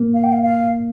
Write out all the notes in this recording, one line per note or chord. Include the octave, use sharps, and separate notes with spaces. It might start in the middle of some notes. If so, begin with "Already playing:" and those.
Already playing: A#3
F5
G5
F5
F5